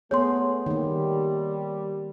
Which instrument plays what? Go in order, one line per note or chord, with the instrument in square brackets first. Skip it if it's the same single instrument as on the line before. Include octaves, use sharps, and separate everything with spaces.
[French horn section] A3 [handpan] B3 G#4 [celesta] C#5 C6
[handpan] D#3 A#3 [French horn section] G3